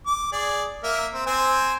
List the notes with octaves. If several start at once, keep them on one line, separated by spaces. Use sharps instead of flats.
D6
G#4 D5
A#3 A#4 E5
C4
C4 C5 G#5